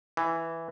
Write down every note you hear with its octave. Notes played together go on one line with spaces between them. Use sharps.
E3